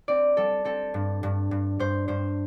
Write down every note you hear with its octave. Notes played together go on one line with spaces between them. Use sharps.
C4 D5
G3 A4
C4 A4
G2
G2
G2
G2 C5
G2 C5